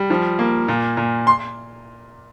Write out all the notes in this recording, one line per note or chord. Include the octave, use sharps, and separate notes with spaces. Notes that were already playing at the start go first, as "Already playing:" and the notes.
Already playing: G3
F3
A#3
A#2
A#2
C6